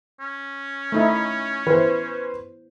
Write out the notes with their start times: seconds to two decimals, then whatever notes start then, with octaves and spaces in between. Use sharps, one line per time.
0.20 C#4
0.92 A3 D#4 E4
1.67 E3 B4 C5